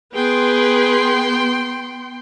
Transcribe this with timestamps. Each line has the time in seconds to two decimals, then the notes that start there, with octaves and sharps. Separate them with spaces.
0.14 B3 G#4 B4 G5 C6